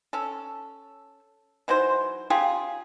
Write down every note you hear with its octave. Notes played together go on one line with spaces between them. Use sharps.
C#4 A4
E3 F#3 D#4 C5
C#3 F4 G4 G#4